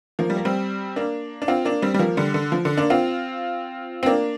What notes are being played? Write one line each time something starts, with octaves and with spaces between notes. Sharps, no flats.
F3 A#3
G3
A#3
G3 C4
A#3 D4
D4
C4 F4
A#3 D4
G3 C4
G3
F3 A#3
D3 G3
D3
F3
D3
A#3 D4
C4 F4
C4
A#3 D4